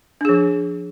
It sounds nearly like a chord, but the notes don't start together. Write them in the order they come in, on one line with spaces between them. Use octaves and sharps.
D4 G#4 F3